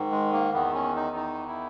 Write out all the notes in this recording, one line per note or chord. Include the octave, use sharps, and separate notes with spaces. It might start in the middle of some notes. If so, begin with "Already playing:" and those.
Already playing: G#2 D#3
G#3
A#3
E2 D#3 B3
C#4
D#4
D#4
E4